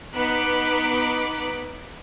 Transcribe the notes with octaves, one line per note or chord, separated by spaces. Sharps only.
B3 D#4 D6 F#6 B6